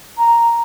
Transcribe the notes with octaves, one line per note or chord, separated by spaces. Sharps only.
A#5